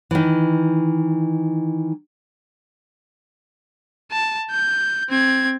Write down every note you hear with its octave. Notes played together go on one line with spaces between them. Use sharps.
D#3 E3
A5
G6
C4 G#6